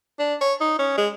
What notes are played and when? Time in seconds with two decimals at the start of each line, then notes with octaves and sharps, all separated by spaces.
0.19 D4
0.41 C#5
0.61 D#4
0.79 C#4
0.98 G#3